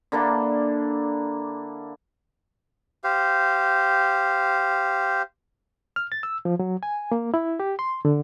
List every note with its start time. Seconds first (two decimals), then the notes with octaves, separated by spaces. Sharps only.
0.12 D3 A#3 D4 E4
3.04 G4 C5 F5
5.96 F6
6.12 A6
6.23 E6
6.45 F3
6.59 F#3
6.83 G#5
7.12 A#3
7.34 E4
7.60 G4
7.79 C6
8.05 D3